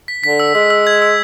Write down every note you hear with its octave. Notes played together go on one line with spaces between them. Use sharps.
B6
D3 B6
E6
G#3 E6
E6
G#6
E6